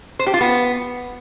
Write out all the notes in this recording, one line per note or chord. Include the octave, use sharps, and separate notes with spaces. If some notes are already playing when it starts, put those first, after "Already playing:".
C5
G4
F4
B3